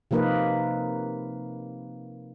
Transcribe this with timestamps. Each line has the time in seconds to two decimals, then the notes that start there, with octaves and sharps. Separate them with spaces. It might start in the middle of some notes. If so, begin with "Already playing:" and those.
0.11 C3 F3 A#3 D#4 A#4 B4